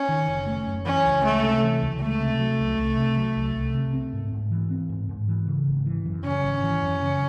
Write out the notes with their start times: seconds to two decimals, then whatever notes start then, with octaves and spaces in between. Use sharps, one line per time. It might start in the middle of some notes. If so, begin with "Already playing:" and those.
Already playing: C#4
0.09 D#3
0.28 F#1
0.47 A3
0.67 F#2
0.86 E3 C#4
1.05 C#2
1.24 G#3 A3
1.43 C3
1.63 E3
1.82 C#2
2.01 G#3 A3
2.20 C3
2.39 F#3
2.59 C2
2.78 C2
2.97 C3
3.17 F#3
3.36 C2
3.55 C2
3.74 C3
3.93 C4
4.13 G#2
4.32 G#2
4.51 E3
4.70 C4
4.89 G#2
5.09 G#2
5.28 E3
5.47 C#3
5.67 G#1
5.86 E3
6.06 F#2
6.24 C#3 C#4
6.44 G#1
6.63 E3
6.82 F#2
7.01 C#3